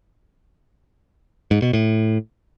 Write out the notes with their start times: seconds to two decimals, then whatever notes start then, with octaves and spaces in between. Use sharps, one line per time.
1.51 G#2
1.62 B2
1.73 A2